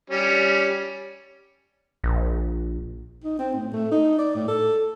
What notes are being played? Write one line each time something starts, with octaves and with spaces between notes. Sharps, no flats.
G3 C#4
A#1
D#4
C4
A2
A3
D#4
D5
A2
A4